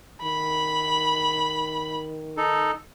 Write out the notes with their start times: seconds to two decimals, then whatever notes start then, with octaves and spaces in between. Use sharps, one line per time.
0.23 D#3 B5
2.37 D#4 A4